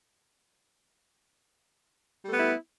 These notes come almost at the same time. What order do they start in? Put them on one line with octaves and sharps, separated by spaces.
G3 A3 B3 E4